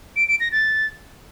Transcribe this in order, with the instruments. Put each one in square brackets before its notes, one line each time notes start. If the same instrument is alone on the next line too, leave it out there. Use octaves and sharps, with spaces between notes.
[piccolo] D7
D7
A#6
A6